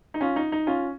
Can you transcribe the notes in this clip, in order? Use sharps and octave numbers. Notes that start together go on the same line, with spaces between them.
D#4
C#4 F4
D#4
D#4
C#4 F4